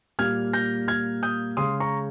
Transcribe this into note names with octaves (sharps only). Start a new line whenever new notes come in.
A#2 G3 A#3 F6 G#6
G6 A#6
F6 G#6
D#6 G6
C#3 G#3 C6 D#6
A#5 C#6